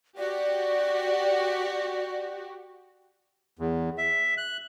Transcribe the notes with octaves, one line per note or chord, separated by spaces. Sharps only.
F#4 G4 D5
E2
E5
F#6